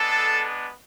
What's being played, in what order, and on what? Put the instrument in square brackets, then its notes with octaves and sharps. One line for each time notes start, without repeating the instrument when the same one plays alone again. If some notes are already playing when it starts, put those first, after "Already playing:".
Already playing: [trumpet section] G#3 B3 D4 A4